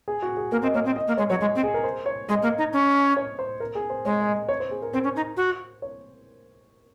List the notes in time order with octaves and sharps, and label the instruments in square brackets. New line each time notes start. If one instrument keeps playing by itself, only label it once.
[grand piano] G#4
F#4
G#4
[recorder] A#3 [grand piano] A#4
[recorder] C4 [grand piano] D#5
[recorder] A#3 [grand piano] C#5
[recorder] C4 [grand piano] D#5
[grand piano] D#5
[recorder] A#3
[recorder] G#3 [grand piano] C#5
[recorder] F#3 [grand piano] C#5
[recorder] G#3 [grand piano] D#5
[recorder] C4
[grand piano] G#4
A#4
C5
C#5
[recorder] G#3 [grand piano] D#5
[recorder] A#3
D#4
C#4
[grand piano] C#5
C5
A#4
G#4
C5
[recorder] G#3 [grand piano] C#5
[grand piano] D#5
C#5
C5
G#4
A#4
[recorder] C4 [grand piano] C5
[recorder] C#4
D#4
F#4
[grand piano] C#5